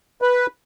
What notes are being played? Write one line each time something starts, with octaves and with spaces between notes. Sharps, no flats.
B4